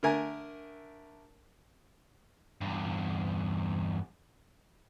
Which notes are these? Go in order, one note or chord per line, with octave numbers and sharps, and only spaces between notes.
D3 A3 A#4 G#5
E2 G2